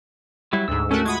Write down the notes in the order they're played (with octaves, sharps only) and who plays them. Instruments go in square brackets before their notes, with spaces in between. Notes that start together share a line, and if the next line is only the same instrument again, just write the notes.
[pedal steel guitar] F#3 G3 E4
[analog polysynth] D2 G#2 [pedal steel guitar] E6
[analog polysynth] A3 F#4 [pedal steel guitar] C#4 A4 A#4
[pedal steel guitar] G#3 F4 F#5 [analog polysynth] B5 D#6 G#6